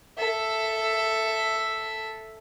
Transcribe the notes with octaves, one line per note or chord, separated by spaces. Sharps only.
A4 E5